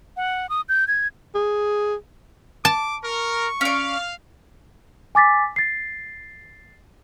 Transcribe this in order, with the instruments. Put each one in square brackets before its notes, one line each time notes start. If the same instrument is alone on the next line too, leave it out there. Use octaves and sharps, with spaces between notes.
[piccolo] F#5
D#6
G6
G#6
[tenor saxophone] G#4
[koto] A5 [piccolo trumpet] D6
[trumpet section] A#4 [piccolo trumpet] C#6
[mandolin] C#4 D5 [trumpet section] F5
[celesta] G#5 D6 A6 B6
A6 C7